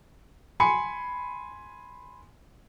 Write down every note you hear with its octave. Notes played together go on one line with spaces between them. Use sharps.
G#5 B5 C6 C#7